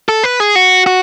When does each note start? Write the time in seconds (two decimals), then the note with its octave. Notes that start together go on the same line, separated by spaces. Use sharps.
0.09 A4
0.23 B4
0.40 G#4
0.55 F#4
0.86 F#4